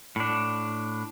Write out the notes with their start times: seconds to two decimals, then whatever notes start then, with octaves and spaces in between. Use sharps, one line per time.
0.16 A2 D4